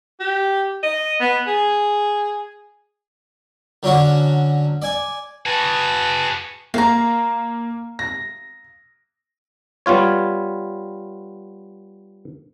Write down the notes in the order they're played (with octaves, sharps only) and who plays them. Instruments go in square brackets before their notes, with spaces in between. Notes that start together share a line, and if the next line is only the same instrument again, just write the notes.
[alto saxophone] G4
D#5
B3
G#4
[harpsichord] D3 F#3 C#4 D4 F#4
D5 G#5
[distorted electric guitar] F#4 G#4 [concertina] B4 A5
[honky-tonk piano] A#3 [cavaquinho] F5 A#5
[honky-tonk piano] A#6
[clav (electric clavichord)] G3 B3 F4 C#5